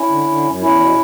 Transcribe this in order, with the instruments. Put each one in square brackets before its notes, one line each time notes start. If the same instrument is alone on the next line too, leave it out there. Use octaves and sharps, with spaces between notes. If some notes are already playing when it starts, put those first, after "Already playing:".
Already playing: [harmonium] C#4 E4
D3
D3
F#2
E2 C#4 E4
B2